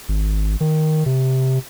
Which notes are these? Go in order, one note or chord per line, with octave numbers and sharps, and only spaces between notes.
G#1
D#3
C3